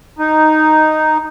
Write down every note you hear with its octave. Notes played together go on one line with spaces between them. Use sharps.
D#4